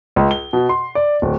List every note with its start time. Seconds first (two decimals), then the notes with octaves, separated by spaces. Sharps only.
0.16 C#2
0.31 G7
0.53 B2
0.69 C6
0.95 D5
1.22 D1